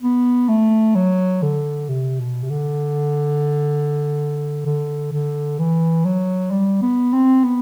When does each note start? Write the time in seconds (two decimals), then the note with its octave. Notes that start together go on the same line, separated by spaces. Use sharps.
0.03 B3
0.49 A3
0.95 F#3
1.42 D3
1.89 C3
2.20 B2
2.43 C3
2.50 D3
4.66 D3
5.13 D3
5.59 E3
6.05 F#3
6.51 G3
6.82 B3
7.13 C4
7.44 B3